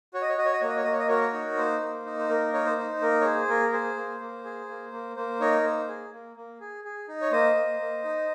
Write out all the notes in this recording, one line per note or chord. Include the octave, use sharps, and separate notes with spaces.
F#4 C#5
D#5
C#5
F#4 D#5
C#5
D#5
A#3 C#5
D#5
C#5
A#3 D#5
C#5
D#5
F#4 A#4 C#5
D#4
A#3 C5
A#3
D#4
C5
A#3 A#4
D#4 C#5
C5
D#4
A#3 A#4
C#5
G#4 C5
A#3 A#4
G#4 C5
A#3
A#3
G#4
A#3
A#3
A#3 C5
D#4 A#4 C#5
A#3 C5
G#4
A#3
A#3
G#4
G#4
D#4
C#5
A#3 C5 D#5
A#3
A#3
D#4